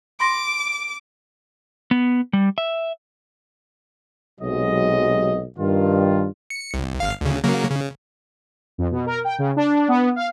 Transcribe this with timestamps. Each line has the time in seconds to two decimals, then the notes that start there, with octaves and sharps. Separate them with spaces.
0.20 B5 C6 D6 A#6
1.91 B3
2.33 G3
2.58 E5
4.41 B1 C3 F#3 G#3 D#5
5.58 G2 D#3 F4
6.50 C#7
6.74 C2
7.00 G1 F5
7.21 D2 C#3
7.44 C#3 F#3 A#3
7.71 C#3
8.78 F2
8.92 B2
9.06 A#4
9.24 G5
9.39 C#3
9.56 D4
9.88 B3
10.16 F5